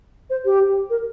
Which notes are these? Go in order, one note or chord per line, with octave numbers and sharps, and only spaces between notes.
C5
G4
A#4